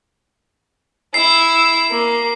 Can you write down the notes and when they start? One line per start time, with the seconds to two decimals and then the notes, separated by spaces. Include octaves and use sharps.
1.14 E4 E6 C7
1.91 A#3